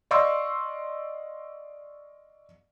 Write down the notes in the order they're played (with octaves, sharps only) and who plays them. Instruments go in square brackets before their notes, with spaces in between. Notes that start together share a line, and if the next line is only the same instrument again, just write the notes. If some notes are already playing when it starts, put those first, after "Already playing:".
[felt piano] D5 D#5 F5 C6 C#6 E6